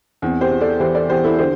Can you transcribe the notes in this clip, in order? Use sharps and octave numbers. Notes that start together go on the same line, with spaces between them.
E2 C4
G4 C5
E2
A4 D5
E3 G4 C5
A4 D5
E2 G4 C5
E4 A4
D3 G4 C5